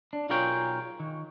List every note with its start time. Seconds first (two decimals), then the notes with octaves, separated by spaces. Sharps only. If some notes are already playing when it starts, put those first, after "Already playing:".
0.13 D4
0.29 B1 F4 G#4 A#4 C#5 G5
1.00 D#3